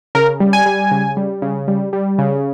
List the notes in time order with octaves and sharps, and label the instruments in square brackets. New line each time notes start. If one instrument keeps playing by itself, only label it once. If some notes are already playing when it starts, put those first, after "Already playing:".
[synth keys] C#3 A#4
G3
G#5
G3
C#3
G3
C#3
G3
G3
C#3